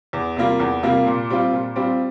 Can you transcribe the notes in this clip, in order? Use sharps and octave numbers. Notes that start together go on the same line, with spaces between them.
E2
C3 G3 A#3 F4
E2
C3 G3 A#3 F4
A#2
G3 C4 F4
A#2
G3 C4 F4